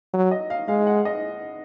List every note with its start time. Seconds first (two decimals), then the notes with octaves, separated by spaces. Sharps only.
0.14 F#3
0.31 D#5
0.50 F5
0.68 G#3 F5
0.87 F#5
1.05 D#5